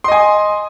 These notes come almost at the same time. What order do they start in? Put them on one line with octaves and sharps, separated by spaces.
C6 D#5 G#5